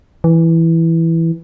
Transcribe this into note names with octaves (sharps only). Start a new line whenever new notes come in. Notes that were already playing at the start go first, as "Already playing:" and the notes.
E3